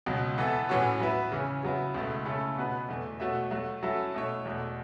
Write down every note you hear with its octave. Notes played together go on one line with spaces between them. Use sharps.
C#2 B2 F#3
E3 B3 A4 E5
A2 E3 C#4 F#4 C#5
F#3 B3 E4 B4 E5
C#3 E3 C#4
C#3 F#3 B3 E4
C#2 B2 A3 E4
C#3 A3 C#4 E4 A4
B2 B3 F#4 B4
E2 E3 A3
B2 A3 F#4 C#5 E5
F#3 A3 F#4
F#3 C#4 E4 A4 E5
B2 A3 E4 C#5
E2 B2 A3